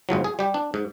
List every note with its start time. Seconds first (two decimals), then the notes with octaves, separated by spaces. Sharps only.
0.09 G1 G#2 F3 F#3
0.24 G#4
0.39 G3 G4
0.54 D4
0.74 G#2